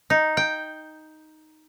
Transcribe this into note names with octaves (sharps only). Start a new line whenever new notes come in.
D#4
G5